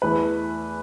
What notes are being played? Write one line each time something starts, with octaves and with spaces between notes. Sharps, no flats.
E2 E3 A3 B4